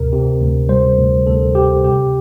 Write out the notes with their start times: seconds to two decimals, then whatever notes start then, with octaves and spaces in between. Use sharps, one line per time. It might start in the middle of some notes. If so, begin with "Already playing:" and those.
Already playing: D2 C3 A#4
0.12 C3
0.41 D2
0.69 G3 C5
0.98 D2
1.26 D2 A4
1.55 D2 G4
1.83 C3 G4